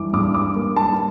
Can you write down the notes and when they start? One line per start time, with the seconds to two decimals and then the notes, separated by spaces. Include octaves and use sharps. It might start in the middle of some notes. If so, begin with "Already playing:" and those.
Already playing: G2 E3 D6
0.13 G2 D6
0.34 D6
0.55 A#3
0.76 A5